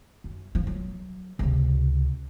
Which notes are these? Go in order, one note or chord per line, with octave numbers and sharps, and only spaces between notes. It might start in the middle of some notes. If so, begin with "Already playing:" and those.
F#2
F3
F#3
C#2 C3